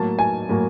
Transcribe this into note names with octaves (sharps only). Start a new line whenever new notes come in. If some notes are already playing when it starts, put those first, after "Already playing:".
Already playing: A2 F#3 A#3 A5
G#5
A2 F#3 A#3